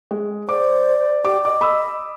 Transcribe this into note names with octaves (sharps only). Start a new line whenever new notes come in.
G#3
C5 D5 D6
G4 D6
D#5 D6
B5 D#6 E6